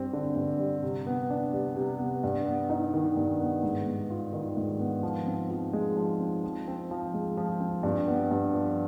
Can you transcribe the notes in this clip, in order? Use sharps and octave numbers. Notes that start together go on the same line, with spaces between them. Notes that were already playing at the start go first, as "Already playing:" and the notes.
Already playing: G2 G3 C4
D3
G2
G3
C3
B3
D4
G3
C3
B3
G2
B3
D#4
D#3
G2
B3
G#2
B3
F4
D#3
G#2
B3
F3
C4
F3
G#3
F3
C4
F3
C4
F3
G#3
F3
C4
G2
B3
G2
F3